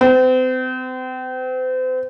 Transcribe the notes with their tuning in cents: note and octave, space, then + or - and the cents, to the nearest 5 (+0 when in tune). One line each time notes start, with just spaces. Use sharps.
C4 -35